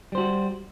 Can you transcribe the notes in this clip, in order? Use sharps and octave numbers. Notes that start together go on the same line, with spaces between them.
G3 F#4 C5